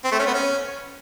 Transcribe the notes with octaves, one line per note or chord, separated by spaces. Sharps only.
C4
A3
C#4
B3
C#4